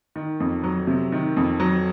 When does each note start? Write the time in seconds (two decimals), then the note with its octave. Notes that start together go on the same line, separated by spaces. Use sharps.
0.16 D#3
0.40 F2
0.64 F#3
0.87 C3
1.12 D#3
1.37 F2
1.60 F#3